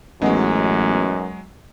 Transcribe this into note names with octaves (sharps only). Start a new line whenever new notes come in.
A1 F#2 F#3 G#3 B3 D#4 F#4